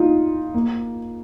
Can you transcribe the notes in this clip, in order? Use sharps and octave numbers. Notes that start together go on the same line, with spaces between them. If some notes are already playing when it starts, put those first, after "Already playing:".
Already playing: D#4 F4
A#3